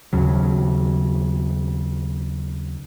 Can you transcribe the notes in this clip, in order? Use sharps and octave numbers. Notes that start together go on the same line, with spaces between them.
D#2 C#3 F#3